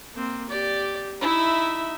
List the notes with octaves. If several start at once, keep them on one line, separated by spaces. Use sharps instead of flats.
A#3 C4
G4 D5
D#4 E4 E5